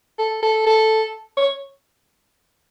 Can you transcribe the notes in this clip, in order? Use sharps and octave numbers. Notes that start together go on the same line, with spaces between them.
A4
A4
A4
C#5